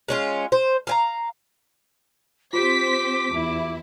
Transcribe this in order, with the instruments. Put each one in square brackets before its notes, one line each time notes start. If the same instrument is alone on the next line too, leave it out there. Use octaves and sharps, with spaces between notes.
[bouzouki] G#3 C#4 F4
C5
F5 G#5 A#5
[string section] C4 C5 B6 [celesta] F4 G4 [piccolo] D6
[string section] E2 E4